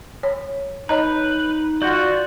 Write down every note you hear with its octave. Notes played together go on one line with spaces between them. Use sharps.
C#5
D#4 B4 C#5 D#5 A#5
F4 F#4 D5 G6